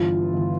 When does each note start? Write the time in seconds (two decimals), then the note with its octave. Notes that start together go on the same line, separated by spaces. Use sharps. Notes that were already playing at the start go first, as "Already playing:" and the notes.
Already playing: G1 G2 E3 F4
0.33 G1 E3